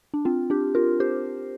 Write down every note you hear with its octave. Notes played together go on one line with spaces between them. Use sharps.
D4
C4 F4
D4 G4
F4 A#4
G4 C5